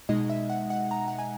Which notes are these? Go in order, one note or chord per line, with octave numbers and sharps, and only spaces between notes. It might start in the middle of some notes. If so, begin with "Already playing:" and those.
B2 G#3 D#4 D#5
E5
F#5
F#5
A#5
F#5
G#5